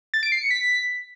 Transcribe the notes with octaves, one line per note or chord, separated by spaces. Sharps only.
A6
D7
C7
C#7
B6